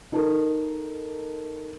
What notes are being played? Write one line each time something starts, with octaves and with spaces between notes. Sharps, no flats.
D#4 A4 A#4